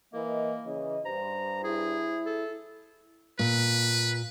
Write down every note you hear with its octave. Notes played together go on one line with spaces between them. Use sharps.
E3 A#3 A#4 D#5
C#3 E3 D#5
G2 C5 A#5
E4 G#4
A4
A#2 B4